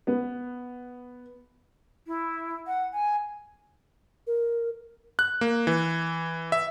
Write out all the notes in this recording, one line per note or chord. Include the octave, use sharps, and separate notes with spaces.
B3
E4
F#5
G#5
A#4
F#6
A#3
E3
E5